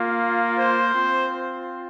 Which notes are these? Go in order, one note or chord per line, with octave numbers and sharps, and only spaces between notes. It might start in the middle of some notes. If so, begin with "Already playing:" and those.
Already playing: A#3 F4
C5
C4 F4